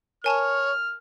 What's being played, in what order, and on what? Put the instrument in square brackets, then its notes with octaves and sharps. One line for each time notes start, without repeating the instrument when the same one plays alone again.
[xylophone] A#4 G#5 A5 [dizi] C#5 [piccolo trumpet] F6